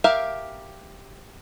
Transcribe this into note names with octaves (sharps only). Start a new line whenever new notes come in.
G4 A#4 E5 F5